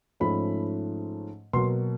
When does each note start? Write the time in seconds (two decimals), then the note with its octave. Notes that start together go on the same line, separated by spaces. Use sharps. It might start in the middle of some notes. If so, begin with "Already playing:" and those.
0.20 G#2 F3 A3 C#4 B5
1.53 B2 F#3 A#3 C6